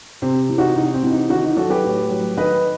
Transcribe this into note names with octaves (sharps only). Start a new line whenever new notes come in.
C3 C4
E3
D#4 F#4
C3 D#4
C4
E3
D#4
D#3 D#4 F#4
D#4
F#3 F#4 A4
G4 B4
A2
F#3
D#3 B4 D#5